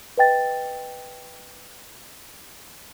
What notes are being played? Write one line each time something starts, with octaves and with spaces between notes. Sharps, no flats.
B4 D#5 G5 A6